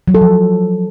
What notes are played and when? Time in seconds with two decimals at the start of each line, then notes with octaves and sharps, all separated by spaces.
0.08 F#3
0.15 A4
0.21 F3